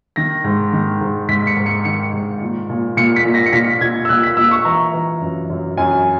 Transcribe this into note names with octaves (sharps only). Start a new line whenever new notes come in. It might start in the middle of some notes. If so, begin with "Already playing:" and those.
D#3 A#6
G#2
D#3
G#2
G#2 B6
C#7
G#2
C#7
D#3 C#7
G#2
A#2
A#2
A#2 C#7
B6
A#2
A#6
C#7
A#2 B6
A#2 G#6
E6
A#2 F#6
B6
A#2 E6
C#6
E3 A#5
E3
F#2
F#2
F#2 G#5